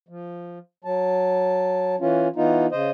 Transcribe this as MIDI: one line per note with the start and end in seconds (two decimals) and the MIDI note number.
0.08 0.58 53
0.85 1.95 54
0.85 1.95 81
2.00 2.28 52
2.00 2.28 61
2.00 2.28 65
2.36 2.66 52
2.36 2.66 59
2.36 2.66 63
2.36 2.66 65
2.72 2.91 49
2.72 2.91 72
2.72 2.91 75